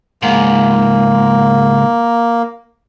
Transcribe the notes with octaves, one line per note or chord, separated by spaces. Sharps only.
C#2 G#2 A#3